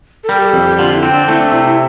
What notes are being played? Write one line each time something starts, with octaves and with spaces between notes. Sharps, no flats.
A4
G3 A#4
G4
A4
F2
G4
D3 F4
E4
C4
D4
A3 E4
D4
C3 E4
E4